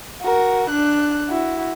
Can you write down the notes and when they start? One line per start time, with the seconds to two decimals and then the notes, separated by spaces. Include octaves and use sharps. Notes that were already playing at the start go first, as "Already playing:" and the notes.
0.21 F#4 A#4
0.70 D4 F#6
1.29 E4 F#4